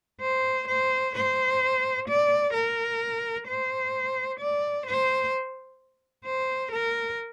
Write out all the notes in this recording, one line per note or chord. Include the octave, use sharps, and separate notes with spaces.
C5
C5
C5
D5
A#4
C5
D5
C5
C5
A#4